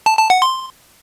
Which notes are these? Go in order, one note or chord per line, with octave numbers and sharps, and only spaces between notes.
A5
A5
F#5
C6